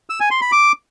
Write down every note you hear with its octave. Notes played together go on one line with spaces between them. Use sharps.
E6
G#5
C6
B5
D6